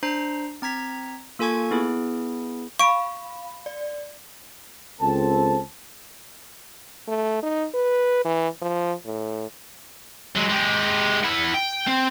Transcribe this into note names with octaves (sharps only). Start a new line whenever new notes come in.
D4 C5 A#5 C7
C4 A#5 G#6 B6
A#3 F4 A4 G#5 C#6 G#6
B3 E4 G#4
F5 B5 C#6 D7
D5
C#2 C4 A4 A5
A3
D#4
B4
E3
F3
A2
F#3 G#3
G#3 G4
E4 F#5
G5
C4